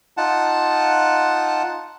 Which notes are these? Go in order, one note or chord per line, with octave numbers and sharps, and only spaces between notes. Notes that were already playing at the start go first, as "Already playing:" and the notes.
D#4 F4 F#5 A5